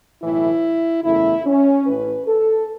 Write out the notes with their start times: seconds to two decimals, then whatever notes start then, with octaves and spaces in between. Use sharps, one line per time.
0.22 B1 A2 E3 E4
1.04 F#1 E2 C#3 A3 E4
1.45 C#4
1.86 A1 A2 E3 B4
2.27 A4